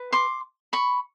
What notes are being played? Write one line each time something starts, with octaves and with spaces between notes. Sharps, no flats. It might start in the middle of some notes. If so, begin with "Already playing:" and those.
Already playing: B4
C6 D6
B5 C#6